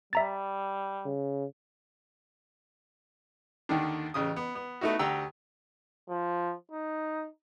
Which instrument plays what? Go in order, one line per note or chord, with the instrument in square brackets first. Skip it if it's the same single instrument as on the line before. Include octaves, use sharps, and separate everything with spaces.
[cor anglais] G3 [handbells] E5 A#5 A6
[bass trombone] C#3
[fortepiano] D#2 D3 D#3 D4
A1 C#3 D#6
B3
B3
A3 B3 D#4 E4 F#4
D2 G4 F#5 G5 A#5 E6
[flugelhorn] F3
D#4